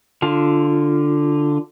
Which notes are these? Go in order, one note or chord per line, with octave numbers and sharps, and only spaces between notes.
D3 F4